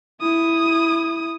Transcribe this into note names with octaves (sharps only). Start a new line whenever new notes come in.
E4 D#6